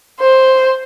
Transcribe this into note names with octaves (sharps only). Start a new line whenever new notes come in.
C5